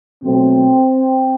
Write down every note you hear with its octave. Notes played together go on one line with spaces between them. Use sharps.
B2 F#3 A3 C4